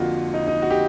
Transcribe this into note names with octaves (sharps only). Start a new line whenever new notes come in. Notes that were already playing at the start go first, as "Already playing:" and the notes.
Already playing: F2 D3 F3 A#3 F4 F#4
D#4
D#4
F#4
G4